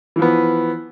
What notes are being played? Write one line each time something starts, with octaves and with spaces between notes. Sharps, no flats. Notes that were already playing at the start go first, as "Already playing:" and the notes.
E3 F3 B3